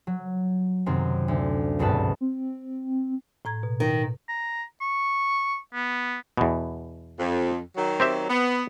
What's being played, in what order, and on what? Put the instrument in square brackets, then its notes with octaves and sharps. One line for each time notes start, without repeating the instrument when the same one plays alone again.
[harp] F#3
F#2 C3 D#3 C4
D2
G#1 C#2 G2 B2 B4 A5
[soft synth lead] C4
[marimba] A2 A#5 G#6
B2
[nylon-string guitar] D#3
[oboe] A#5
C#6
B3
[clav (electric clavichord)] E2 B2
[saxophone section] F2
D#3 F#3
[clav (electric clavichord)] C4 G4 E5
[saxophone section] B3